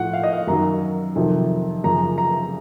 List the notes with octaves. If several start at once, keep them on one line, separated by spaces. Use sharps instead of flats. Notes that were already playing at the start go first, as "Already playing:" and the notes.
Already playing: A2 F3 F#5
F5
D#5
F5
F#2 D#3 F#3 A#5
F2 C3 D#3 F#3
F#2 C#3 F3 A#5
A#5